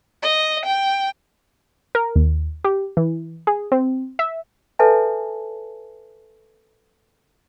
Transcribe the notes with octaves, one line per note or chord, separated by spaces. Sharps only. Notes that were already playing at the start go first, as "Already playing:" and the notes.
D#5
G5
A#4
D#2
G4
E3
G#4
C4
E5
A4 B4 C#5 E5 G#5 A5